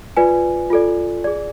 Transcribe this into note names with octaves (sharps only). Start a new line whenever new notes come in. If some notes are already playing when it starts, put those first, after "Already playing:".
F4 B4 D5 G#5
F4 A4 D5
G#4 D5